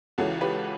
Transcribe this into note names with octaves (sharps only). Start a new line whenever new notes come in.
C#2 C#3 E3 F#4 A4
G4 B4